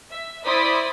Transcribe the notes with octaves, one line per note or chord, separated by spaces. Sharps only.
E5
E4 C5 D5 D#6 B6